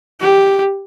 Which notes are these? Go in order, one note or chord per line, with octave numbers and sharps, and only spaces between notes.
G4